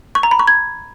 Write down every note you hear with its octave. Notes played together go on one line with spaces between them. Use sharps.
C#6
A#5
B5
C#6
G#6